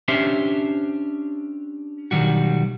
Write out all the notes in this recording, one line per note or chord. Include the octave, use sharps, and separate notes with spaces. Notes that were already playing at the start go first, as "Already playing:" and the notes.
C#4 D4 G4 C5 E5 C6
B1 E2 D#3 G3 F#4